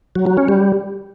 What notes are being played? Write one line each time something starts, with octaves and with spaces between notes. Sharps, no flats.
F#3
F#3
C#4
G3